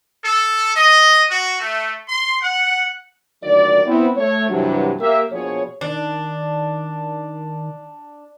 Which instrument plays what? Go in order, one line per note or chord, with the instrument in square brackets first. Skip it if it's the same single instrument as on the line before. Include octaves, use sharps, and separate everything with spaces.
[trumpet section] A4
D#5
F#4
A3
C6
F#5
[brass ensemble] D2 A#2 D#3 F#3 D5
B3 C4 E4
A3 C#5
G2 C3 E3 F#3
A#3 G4 A#4 E5
A#1 B2 F3 G#4 C#5
[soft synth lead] D#3 [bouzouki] D4